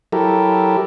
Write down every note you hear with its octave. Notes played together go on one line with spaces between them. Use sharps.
F#3 E4 G4 A4 A#4